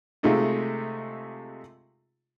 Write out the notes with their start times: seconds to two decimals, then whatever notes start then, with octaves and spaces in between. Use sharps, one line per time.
0.23 C3 G#3 A3 D#4 F4